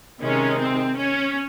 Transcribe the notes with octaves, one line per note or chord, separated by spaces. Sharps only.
C3 D#3 G#3 C#4 D#4
C4
C#4